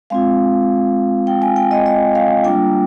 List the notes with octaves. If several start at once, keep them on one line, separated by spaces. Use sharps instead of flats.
G#3 C4 F4 F5
G5
G#5
G5
D#5
D#5
F5
G3 A#3 D4 F4 G5